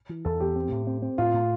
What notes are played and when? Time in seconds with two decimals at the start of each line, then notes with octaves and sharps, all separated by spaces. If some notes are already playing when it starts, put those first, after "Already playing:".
0.09 E3
0.25 E2 A4
0.40 E2 G4
0.56 C4
0.72 A2
0.87 C4
1.02 C4
1.18 A2 F4
1.34 A2